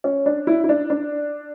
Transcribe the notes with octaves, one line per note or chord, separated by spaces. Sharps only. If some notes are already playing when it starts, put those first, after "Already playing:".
C#4
D4
E4
E4
D4
D4